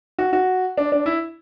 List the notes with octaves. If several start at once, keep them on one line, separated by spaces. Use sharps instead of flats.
F#4
F#4
D4
D4
E4